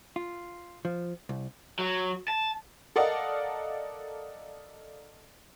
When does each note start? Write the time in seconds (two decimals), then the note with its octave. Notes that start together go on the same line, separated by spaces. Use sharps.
0.16 F4
0.85 F3
1.29 C2
1.79 F#3
2.28 A5
2.96 A4 A#4 D5 D#5 F5 F#5